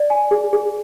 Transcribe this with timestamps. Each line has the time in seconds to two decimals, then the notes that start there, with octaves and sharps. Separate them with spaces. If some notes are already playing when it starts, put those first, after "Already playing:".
Already playing: D5
0.10 G#5
0.31 G#4
0.53 G#4